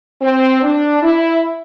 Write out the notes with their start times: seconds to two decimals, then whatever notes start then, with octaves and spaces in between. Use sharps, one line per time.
0.22 C4
0.63 D4
1.02 E4